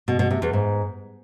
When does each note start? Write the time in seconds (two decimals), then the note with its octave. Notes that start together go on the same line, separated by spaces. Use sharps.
0.08 B2
0.19 B2
0.31 C3
0.42 E2
0.53 G#2